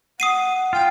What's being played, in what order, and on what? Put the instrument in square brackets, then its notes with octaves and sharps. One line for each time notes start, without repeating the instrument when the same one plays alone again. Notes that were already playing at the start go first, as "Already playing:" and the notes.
[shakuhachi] F#5 [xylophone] D#6 C7 D#7
[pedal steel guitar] F4 [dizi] G5